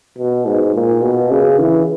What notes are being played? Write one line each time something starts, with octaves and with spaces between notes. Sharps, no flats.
B2
G#2
A#2
B2
C#3
E3